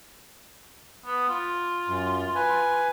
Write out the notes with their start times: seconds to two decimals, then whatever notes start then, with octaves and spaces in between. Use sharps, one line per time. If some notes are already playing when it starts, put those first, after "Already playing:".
1.06 B3
1.29 F4
1.88 F#2
2.35 B4 G#5